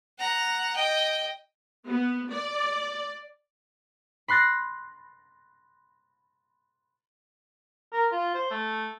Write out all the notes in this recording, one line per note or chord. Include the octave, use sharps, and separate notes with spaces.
F#5 A#5
D#5 G5
B3
D5
B5 C6 F#6 A6 A#6
A#4
F4
C5
A3